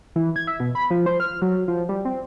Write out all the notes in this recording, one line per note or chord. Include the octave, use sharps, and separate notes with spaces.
E3
G#6
E5
B2
B5
F3
C5
F6
F#3
F3
G3
C4